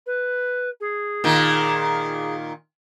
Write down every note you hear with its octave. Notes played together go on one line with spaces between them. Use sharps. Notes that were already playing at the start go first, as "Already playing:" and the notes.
B4
G#4
A#2 D#3